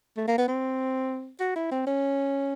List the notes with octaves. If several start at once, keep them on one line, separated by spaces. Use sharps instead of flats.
A3
A#3
B3
C4
F#4
E4
C4
C#4